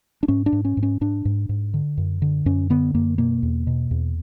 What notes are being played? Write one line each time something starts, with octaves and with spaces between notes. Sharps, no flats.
D4
G#2 C#4
D4
G#2
C#4
G#2
C#4
G#2 D4
G#2
G#2
D3
F#2
D3
F#2 C#4
D3 B3
F#2 A#3
B2 A#3
E2
B2
E2